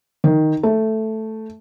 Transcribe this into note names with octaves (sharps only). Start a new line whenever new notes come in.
D#3
A3